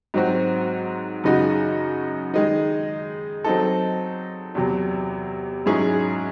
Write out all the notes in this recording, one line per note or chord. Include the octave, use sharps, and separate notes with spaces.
G#2 F#3 C4 F#4
F#2 C#3 G#3 D#4 F#4
D#3 G#3 D#4
F#3 C4 D#4 A4
E2 C3 F#3
G#2 F#3 C#4 E4 G#4